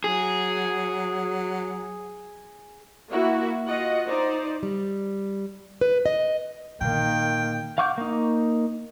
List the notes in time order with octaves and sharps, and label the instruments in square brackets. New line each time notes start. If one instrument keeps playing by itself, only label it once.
[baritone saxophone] F#3 [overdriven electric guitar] G#4
[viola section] A#3 E4 F#4
F4 F#4 D#5 F#5
D#4 C5 D5
[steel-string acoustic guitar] G3
B4
D#5
[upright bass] A#2 [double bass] D#3 A#3 [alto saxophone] G5
[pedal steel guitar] F5 F#5 C#6 D6 G6
A#3 D#4